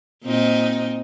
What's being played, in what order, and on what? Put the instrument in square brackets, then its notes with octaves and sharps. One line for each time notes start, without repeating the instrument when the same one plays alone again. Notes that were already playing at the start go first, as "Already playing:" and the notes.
[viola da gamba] A#2 C4 D#4